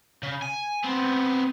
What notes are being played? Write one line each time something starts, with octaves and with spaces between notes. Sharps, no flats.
C#3
G#5
B3 C4